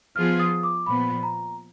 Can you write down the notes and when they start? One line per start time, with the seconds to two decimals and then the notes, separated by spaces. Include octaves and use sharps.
0.16 F3 B3 F4 G#4 F6
0.40 D#6
0.63 D6
0.86 A#2 F3 B3 B5
1.23 A#5